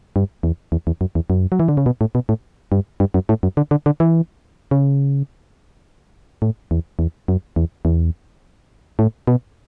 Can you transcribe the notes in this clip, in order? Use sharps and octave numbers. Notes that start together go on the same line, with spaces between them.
G2
E2
E2
E2
F#2
E2
F#2
F#3
E3
D3
C#3
B2
A2
B2
A2
G2
G2
F#2
A2
F#2
D3
D3
D3
E3
C#3
A2
E2
E2
F#2
E2
E2
A2
B2